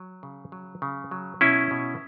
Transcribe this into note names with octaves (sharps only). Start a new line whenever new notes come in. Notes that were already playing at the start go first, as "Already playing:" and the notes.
Already playing: F#3
C#3
F#3
C#3
F#3
B2 C#4 E4
B2